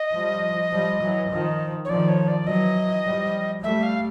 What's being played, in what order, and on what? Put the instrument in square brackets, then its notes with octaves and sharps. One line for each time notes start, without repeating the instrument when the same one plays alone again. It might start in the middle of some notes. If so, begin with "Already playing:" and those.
Already playing: [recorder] D#5
[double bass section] F3 G3
F3 G3
E3 F#3
D#3 F3
[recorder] C#5
[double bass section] D#3 F3 [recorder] D5
[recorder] C#5
D5
[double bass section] E3 F#3 [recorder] D#5
[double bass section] F3 G3
[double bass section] G3 A3 [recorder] E5
[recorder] F5